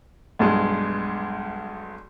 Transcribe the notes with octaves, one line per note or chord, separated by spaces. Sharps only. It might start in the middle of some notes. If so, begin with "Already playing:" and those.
B1 G2 G#3